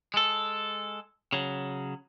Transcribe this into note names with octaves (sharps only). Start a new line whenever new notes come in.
G#3 A4
C#3 F#3